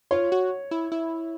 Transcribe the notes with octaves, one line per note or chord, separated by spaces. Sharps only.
F4 C#5
F#4
E4
E4